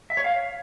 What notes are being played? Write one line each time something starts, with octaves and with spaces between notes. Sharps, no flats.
E5
C#5
F5